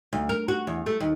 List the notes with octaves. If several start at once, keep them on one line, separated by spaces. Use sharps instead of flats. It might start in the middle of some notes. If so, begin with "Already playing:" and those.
D2
A#4
F#4
E2
A3
D#2